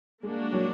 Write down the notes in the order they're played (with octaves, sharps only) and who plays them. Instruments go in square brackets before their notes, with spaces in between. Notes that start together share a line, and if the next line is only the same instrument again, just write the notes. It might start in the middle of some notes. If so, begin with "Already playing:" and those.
[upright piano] G#3 [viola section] A#3 D4 F#4
[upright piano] F#3